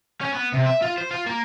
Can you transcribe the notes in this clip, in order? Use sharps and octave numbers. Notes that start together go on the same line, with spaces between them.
C#4
B3
C3
E5
F4
C5
F4
A#3